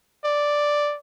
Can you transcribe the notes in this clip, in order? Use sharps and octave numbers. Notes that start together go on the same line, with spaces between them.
D5